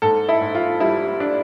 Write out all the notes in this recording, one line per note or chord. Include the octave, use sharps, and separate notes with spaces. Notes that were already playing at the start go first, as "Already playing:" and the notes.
G#2 A4
E4
G#2
F4
G3 E4
D4